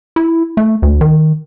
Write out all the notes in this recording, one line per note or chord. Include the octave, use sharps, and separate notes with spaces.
E4
A3
D2
D#3